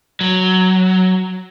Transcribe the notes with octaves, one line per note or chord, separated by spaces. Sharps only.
F#3